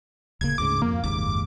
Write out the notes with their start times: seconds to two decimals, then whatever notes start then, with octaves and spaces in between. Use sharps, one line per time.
0.41 D1 C#3 A#3 G#6
0.58 D2 G#2 C#3 D6
0.82 F2 A#3
1.04 F#1 D#2 G#2 D6